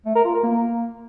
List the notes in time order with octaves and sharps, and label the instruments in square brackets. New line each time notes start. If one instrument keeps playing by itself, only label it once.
[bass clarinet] A3
A#4
F4
A#4
A#3